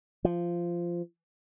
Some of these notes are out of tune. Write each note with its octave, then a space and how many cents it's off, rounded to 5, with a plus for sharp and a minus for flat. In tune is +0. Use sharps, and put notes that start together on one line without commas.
F3 -15